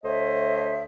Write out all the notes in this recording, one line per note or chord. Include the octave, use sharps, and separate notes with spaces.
D2 A3 C5 C#5 D#5 E5